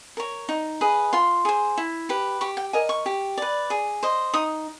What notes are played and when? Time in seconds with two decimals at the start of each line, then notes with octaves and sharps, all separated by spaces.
0.17 A#4 C#5
0.49 D#4
0.81 G#4 B4 D#5
1.13 F4 C6
1.45 G#4 C5
1.77 E4
2.09 G4 B4
2.41 G4 C#6
2.57 G5
2.73 A#4 D#5 G#5
2.89 C#6
3.06 G4
3.38 B4 D5
3.70 G#4
4.03 C5 D#5
4.34 D#4 D#6